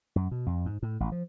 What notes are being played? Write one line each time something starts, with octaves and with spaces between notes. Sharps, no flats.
F#2
B2
F2
G#2
A2
A1
F3